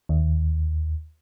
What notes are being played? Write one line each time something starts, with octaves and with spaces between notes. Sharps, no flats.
D#2